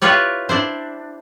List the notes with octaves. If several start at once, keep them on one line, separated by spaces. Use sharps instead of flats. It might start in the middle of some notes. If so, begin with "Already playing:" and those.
E4 F4 G4 B4 C#5 D5
D4 E4 C5